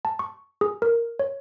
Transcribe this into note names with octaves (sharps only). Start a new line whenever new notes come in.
A5
C#6
G#4
A#4
C#5